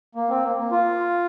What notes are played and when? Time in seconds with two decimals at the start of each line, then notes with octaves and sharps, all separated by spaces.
0.15 A#3
0.29 C4
0.43 A#3
0.57 A#3
0.72 F4